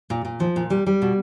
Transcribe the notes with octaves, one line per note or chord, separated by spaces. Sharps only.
A#2
A#2
F3
A#2
G3
G3
B2